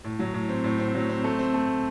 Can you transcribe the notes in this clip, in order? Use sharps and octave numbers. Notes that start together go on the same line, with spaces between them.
A2
F#3
A2
C4
A2
C4
F#3
C4
A3
C4
A3